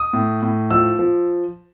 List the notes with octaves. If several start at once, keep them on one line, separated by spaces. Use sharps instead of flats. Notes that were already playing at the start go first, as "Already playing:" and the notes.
Already playing: D#6
A2
A2
F3 E6
F3